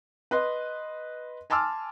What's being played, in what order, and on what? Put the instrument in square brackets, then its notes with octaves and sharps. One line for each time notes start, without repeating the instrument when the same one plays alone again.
[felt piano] B4 D#5 C6
G#5 A5 C6 D6 E6 F6